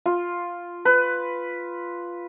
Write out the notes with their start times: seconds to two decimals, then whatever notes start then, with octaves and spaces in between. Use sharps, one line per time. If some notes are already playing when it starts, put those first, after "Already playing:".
0.06 F4
0.85 B4